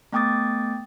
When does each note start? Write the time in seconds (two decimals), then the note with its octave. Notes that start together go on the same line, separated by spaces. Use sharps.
0.12 A3 B3 G5 D6 D#6 A6